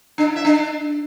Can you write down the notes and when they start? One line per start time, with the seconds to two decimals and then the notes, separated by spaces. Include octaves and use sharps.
0.18 D4
0.27 E4
0.36 E5
0.45 D4